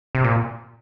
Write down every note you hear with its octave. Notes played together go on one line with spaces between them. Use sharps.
C3
A#2